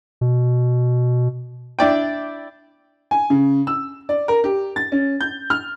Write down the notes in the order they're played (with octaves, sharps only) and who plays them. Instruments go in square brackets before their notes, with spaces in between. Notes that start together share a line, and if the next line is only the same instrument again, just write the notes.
[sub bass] B2
[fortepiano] D4 E4 D5 G5
[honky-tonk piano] G#5
C#3
E6
D5
A#4
G4
A6
C#4
G6
F6